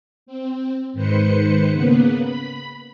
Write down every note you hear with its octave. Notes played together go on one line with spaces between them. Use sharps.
C4
G#2 D#3 B4 C5 C#7
C#3 A#3 B3 B4
B5